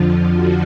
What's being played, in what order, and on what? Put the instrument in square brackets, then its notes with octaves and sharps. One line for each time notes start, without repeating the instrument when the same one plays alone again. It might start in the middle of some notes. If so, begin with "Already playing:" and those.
Already playing: [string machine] F2 D3 F3 F4
F#4